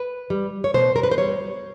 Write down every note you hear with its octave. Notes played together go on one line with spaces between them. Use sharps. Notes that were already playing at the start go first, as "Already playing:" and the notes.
Already playing: B4
G3
C#5
B2 C5
A#4
B4
C5
G3 C#5